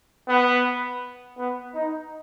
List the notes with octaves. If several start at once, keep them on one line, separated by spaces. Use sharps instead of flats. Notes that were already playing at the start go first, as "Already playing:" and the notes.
B3
B3
D#4